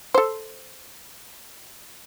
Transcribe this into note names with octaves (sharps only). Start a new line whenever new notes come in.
A4 C5